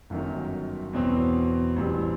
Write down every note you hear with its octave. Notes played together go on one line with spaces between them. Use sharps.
G1 F#2 D#3 F#3
E2 B2 F#3 C4
A1 G2 E3 G3 C4